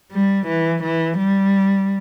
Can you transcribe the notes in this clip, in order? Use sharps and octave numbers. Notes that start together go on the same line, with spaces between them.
G3
E3
E3
G3